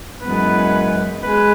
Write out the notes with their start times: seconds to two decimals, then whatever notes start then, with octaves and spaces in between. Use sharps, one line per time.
0.22 F#2 E3 G#3 B3 B4
1.23 G#3 B4